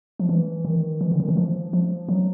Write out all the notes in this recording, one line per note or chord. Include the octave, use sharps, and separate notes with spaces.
F3
E3
D#3
E3
D3
D#3
E3
F3
F3
F#3